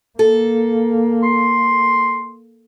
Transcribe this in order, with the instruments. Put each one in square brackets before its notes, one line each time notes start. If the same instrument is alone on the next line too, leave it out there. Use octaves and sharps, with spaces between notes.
[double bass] A#3 [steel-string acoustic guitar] A4
[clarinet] C6